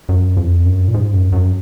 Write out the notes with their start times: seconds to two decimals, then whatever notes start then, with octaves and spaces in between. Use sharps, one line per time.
0.09 F#2
0.37 F2
0.66 F#2
0.88 A#2
0.94 G#2
1.13 F#2
1.32 F#2